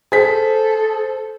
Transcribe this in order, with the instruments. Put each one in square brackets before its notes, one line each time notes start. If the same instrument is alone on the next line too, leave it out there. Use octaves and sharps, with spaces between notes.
[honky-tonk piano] G#4 B6 [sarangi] A4 [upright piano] C5